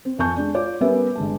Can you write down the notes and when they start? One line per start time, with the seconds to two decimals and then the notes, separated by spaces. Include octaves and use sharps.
0.05 C4
0.19 F2 G#5 A5 C#6 G6
0.36 G#3 D4
0.54 F4 C#5 D5 D6
0.81 G3 B3 C#4 A#4 B4 E5
1.16 G1 G#3 A5